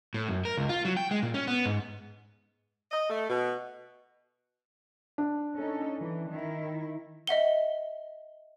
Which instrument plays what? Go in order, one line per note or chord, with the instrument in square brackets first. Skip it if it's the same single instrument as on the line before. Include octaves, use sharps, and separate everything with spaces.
[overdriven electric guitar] A2
F#2
A#4
C#2
F4
F#3
G5
G#3
A#2
C#4
B3
G#2
[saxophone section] D#5
A3
B2
[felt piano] D4
[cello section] C#4 D#4 A4
E3
D#3 E4
[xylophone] D#5 E5 F#5 G7